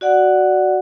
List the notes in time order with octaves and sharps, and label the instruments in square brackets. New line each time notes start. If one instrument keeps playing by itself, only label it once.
[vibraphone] F#4 D5 F#5